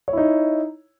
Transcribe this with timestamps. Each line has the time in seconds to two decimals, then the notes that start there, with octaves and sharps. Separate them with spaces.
0.08 C#5
0.13 E4
0.18 D#4